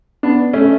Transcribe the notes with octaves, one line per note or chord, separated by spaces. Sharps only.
B3 D4
A3 C#4